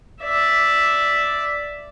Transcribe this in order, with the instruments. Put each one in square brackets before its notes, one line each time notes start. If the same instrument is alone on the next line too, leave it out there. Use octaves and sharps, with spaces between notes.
[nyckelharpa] D5 E5